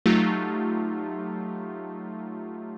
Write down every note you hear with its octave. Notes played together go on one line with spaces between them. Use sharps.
F#3 A3 D#4 F4 G4